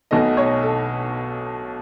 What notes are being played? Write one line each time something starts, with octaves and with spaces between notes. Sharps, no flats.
B1 B2 A3 D#4 D#5
C#5
A4